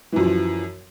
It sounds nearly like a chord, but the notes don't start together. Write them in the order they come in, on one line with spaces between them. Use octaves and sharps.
E3 F#2 F3